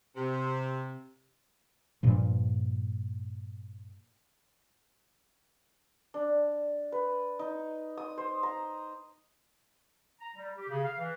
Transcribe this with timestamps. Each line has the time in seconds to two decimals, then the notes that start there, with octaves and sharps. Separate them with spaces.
0.16 C3
2.03 G2 A#2 F3
6.14 D4
6.92 B4
7.39 D#4
7.97 D#6
8.18 C5
8.43 A#5
10.21 A#5
10.36 G3
10.57 G4
10.69 C#3
10.84 F5
10.98 E3